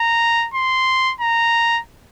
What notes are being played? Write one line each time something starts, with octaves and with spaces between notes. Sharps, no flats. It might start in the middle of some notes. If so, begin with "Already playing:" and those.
Already playing: A#5
C6
A#5